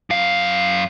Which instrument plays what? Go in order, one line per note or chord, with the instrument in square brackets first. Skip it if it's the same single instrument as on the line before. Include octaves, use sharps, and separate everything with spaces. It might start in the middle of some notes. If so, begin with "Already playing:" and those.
[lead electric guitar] F#2 F5